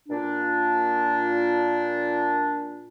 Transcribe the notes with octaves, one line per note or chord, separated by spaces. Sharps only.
A#2 D4